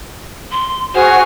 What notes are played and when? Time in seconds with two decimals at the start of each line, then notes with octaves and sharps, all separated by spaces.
0.51 C6
0.95 F#4 G#4 C5 F#5 F6